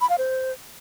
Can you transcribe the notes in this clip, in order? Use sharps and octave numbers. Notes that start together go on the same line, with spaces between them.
B5
F5
C5